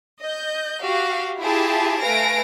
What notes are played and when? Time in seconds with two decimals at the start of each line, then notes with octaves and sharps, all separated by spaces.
0.22 D#5 G6
0.82 F#4 G4 F5
1.39 E4 F4 G4 G#4 A5
2.01 A3 B4 F5 G#5 A#6 D7